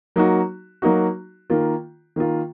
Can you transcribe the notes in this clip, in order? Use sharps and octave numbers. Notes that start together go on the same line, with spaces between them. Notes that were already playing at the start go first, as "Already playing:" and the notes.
F#3 A#3 D#4 F#4
F#3 A#3 D#4 F#4
D#3 A#3 F4
D#3 A#3 F4